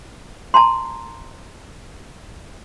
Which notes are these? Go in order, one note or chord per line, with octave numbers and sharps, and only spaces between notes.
A5 A#5 C6